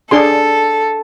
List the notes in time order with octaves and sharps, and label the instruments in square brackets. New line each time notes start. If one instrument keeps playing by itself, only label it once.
[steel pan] D4 G#4 C6 [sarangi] A4